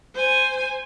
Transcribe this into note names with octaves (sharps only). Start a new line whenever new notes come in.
C5 G#5